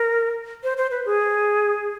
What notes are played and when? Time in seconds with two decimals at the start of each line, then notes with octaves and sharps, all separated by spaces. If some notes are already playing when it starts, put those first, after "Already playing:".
Already playing: A#4
0.64 C5
0.77 C5
0.91 B4
1.06 G#4